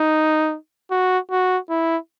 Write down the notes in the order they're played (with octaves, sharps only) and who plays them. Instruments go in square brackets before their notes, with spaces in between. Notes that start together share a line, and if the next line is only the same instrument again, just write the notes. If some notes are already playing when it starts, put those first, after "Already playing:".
Already playing: [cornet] D#4
F#4
F#4
E4